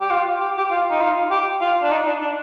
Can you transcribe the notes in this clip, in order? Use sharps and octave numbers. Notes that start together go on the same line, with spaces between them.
G4
F4
G4
G4
F4
D#4
F4
G4
F4
D4
D#4
D4
D4